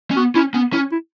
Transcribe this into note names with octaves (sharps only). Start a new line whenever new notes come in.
C#4
B3 F#4
C#4 E4
B3 C#4
C#4 E4
E4